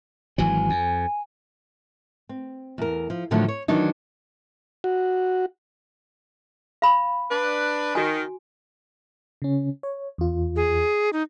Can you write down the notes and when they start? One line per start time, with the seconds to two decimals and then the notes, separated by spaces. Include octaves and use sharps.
0.38 G#1 E3 F#3 G#5
0.70 F2
2.29 C4
2.78 E2 A#4
3.10 F3
3.31 A2 D3 D#3 F3 F#3 A3
3.48 C#5
3.68 D#3 E3 F#3 D4 D#4
4.84 F#4
6.82 F5 B5
7.31 D4 B4
7.95 D#3 F#4 G#5
9.42 C#3 C#4
9.83 C#5
10.18 E2 F4
10.56 G#4
11.13 D#4